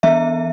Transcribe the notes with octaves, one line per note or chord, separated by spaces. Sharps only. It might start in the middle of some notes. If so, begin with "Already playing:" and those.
E3 B3 E5